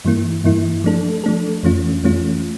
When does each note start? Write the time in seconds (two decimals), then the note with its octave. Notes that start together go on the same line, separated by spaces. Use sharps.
0.05 G2 E3 A#3 E4
0.44 G2 E3 A#3 E4
0.84 F3 A3 D4 A4
1.24 F3 A3 D4 A4
1.63 F2 E3 A3 C#4 F4
2.03 F2 E3 A3 C#4 F4